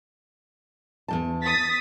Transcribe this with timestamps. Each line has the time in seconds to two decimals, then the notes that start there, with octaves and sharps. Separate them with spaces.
1.08 E2 G#2 A5
1.42 D#6 A6 B6